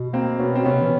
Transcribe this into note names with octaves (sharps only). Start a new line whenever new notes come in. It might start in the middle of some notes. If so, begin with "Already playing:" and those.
Already playing: B2
A#3 C4
B3 C#4
C4
C3 B3 C#4
E3